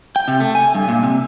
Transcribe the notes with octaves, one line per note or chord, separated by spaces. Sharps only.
G5
C3
A3
G#5
G2
A#2
C3